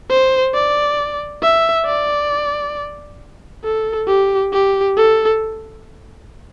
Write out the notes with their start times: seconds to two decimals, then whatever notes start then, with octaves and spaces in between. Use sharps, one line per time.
0.09 C5
0.54 D5
1.42 E5
1.86 D5
3.64 A4
4.07 G4
4.52 G4
4.97 A4